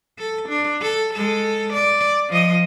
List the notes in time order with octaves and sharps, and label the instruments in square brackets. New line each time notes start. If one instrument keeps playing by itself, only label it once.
[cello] A4
D4
A4
G#3 A4
D5
F3 D#5